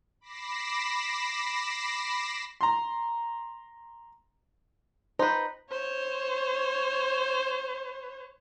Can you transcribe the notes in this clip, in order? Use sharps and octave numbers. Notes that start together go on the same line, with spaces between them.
B5 D6 A#6 C7 E7
A#5 C6
D#4 B4 C5
C5 C#5